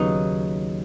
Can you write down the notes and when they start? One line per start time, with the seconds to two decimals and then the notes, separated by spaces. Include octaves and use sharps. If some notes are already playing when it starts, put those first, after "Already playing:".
Already playing: D#2 C#3 F#3 B3 D#4